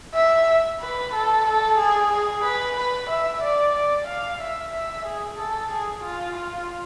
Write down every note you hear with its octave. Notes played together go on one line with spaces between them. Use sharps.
E5
B4
A4
A4
G#4
G#4
B4
B4
E5
D5
D5
F5
E5
E5
G#4
A4
G#4
F4
F4